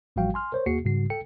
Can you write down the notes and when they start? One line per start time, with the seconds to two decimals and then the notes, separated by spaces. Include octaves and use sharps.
0.16 A1 F3 G3 F#4 F5 G5
0.34 G#5 C6 F6
0.52 A#4 C5 C#5
0.66 D#2 A#3 F#4 G#4 C7 C#7
0.85 G#2 C#3 G3 F#4 C7
1.10 A4 G5 C#7